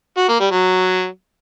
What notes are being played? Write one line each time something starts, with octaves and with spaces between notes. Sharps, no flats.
F#4
A#3
G3
F#3